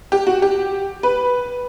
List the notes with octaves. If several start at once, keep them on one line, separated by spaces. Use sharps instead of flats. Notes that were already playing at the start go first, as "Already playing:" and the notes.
G4
F#4
G4
B4